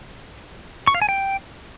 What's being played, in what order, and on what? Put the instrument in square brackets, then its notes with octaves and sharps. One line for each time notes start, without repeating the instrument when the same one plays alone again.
[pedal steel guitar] C#6
F5
G#5
G5